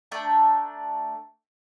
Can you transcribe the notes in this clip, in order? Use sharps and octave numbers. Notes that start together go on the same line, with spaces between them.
A3 D4 G5 A#5